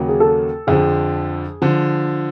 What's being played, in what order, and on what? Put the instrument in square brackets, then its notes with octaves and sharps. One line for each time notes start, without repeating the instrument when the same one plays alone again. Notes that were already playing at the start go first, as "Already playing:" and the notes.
Already playing: [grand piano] D#2 C#3 F#3 A#3
[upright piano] G#4
A4
[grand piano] F2 D3 F3 [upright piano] G#4
[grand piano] D3 F3